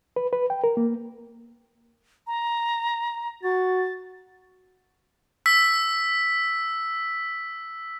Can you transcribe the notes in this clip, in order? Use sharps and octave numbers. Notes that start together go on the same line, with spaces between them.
B4
B4
G5
A#4
A#3
A#5
F#4 A6
E6 B6